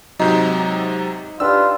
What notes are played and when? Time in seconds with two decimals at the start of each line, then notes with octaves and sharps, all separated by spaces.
0.19 G#2 C3 F#3 D#4
1.40 D4 F4 G4 B4 E6